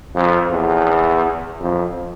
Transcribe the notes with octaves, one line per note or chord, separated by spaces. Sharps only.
F2
E2
F2